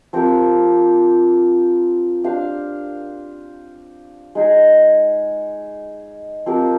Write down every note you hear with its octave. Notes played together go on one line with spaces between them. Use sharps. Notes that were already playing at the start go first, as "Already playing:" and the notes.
F3 C4 G4 A#4
D4 G4 C5 F5
G#3 D#4 G#4
F3 C4 G4 A#4